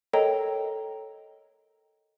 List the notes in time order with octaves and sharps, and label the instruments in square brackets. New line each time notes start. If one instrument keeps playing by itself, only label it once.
[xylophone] A4 A#4 C#5 D#5 G5 A#5